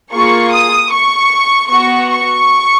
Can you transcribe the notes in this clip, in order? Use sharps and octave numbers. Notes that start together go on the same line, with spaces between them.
A#3 F4 G#4 C#6
D#6
C#6
B3 F#4 C#6
C#6